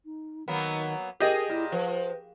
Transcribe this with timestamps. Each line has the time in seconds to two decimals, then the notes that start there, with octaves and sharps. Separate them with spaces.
0.05 D#4
0.48 D#3 F#3 A#3 B3
1.20 G4 G#4 A#4 D#5
1.49 A#2 E4
1.72 F3 B4